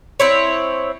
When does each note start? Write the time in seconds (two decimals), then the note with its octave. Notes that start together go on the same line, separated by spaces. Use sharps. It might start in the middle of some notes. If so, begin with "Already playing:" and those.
0.20 C4 E4 C#5